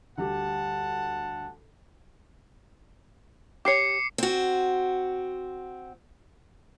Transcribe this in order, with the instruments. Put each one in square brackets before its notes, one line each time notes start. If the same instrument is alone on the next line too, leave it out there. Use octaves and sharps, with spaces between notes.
[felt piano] D2 G3 G4 [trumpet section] F#5 A5
[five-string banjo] G4 C#5 [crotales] D6 C7 C#7
[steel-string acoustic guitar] C4 F#4